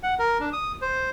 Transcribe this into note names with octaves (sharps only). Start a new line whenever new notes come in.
F#5
A#4
D4
D#6
C5